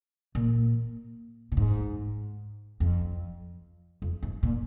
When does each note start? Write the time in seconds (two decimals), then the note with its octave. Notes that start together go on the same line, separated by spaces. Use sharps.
0.35 A#2
1.52 A#2
1.57 G#2
2.80 F2
4.02 F2
4.23 G#2
4.43 A#2